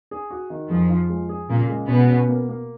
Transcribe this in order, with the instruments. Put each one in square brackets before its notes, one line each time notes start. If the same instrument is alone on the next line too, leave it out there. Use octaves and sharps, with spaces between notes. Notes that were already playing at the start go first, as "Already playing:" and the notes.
[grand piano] G#4
F#4
D#3
[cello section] F2 F3 [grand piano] G#4
[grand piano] F4
G#3
G#4
[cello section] A#2 A#3 [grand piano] C#3
[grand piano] G#3
[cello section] B2 B3 [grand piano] C#4
[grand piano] C#4
A#3
A#3